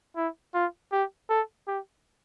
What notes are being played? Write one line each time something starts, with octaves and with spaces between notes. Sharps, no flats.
E4
F4
G4
A4
G4